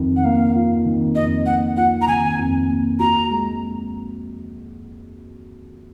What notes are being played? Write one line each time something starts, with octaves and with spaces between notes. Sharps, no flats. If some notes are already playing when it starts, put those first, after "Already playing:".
Already playing: F2 D#3
F#5
A#3 F5
F4
D#3
F2 D#5
A#3 F#5
F4 F#5
A#5
D#3 G#5
F2
A#3
F#4 A#5
G#3